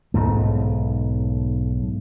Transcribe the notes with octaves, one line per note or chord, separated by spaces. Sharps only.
B1 G#2 A3